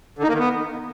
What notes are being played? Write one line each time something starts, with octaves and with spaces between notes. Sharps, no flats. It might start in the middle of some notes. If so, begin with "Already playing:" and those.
D3
D#4
A#3
D#3
B3